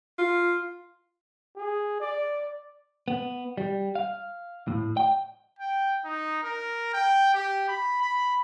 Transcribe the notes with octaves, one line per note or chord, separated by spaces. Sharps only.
F4
G#4
D5
B3
G3
F5
A2
G5
G5
D#4
A#4
G5
G4
B5
B5